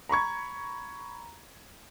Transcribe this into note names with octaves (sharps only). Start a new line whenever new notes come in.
A#5 B5 C#6 G#6